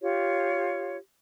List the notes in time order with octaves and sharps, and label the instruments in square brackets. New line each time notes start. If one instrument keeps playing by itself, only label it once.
[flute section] F4 G4 C#5